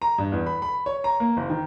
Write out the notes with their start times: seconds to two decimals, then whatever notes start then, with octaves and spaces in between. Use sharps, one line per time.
0.02 A#5
0.18 G2
0.32 E2
0.46 B5
0.62 B5
0.86 C#5
1.04 A#5
1.20 A#3
1.37 F#1
1.50 D#3